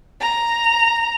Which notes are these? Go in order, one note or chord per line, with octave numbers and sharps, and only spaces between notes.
A#5